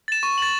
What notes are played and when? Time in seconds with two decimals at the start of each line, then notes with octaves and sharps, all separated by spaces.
0.08 A6 E7
0.23 C#6
0.38 A6 F#7